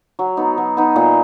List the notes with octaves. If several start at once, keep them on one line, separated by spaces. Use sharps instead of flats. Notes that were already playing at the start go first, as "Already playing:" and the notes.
F#3
B3 D#4
F#3
B3 D#4
A#2